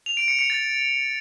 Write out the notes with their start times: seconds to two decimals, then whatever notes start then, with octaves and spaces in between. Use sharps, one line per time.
0.06 F7
0.17 D7
0.28 C#7
0.39 C#7
0.50 A6